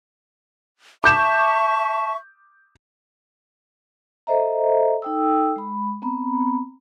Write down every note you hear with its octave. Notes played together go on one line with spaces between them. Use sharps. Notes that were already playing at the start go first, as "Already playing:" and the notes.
E5 A5 C#6 D6 G6 E7
A4 C5 D#5 E5 A#5
D#4 A4 G5 D#6 E6
G#3 B5
B3 C4 A#5 B5